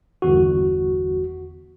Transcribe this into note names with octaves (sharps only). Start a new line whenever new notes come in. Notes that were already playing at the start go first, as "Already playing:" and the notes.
G1 E2 F#4